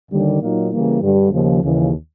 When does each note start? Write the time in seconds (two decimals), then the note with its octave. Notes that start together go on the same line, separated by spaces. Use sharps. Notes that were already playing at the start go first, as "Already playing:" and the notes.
0.11 D#2 D3 G3
0.41 A#2 F#3 A#3 D#4
0.72 C#3 E3 G3 A#3
1.02 G2 D3 G3
1.32 D#2 C#3 F3
1.63 D#2 C#3 E3